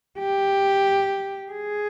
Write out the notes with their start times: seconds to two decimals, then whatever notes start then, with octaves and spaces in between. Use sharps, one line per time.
0.19 G4
1.52 G#4